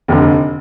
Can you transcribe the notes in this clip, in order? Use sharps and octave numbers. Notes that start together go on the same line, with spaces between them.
F1 D#2 D3